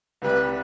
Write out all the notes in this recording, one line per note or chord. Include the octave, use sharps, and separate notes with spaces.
C2 C3 G3 B4